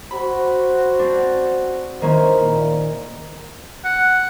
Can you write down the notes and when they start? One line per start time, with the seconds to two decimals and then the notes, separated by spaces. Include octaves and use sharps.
0.11 F#4 C5 B5
0.99 C4 D4
2.01 D#3 A#3 C#4 E4 C5
2.40 A#2
3.84 F#5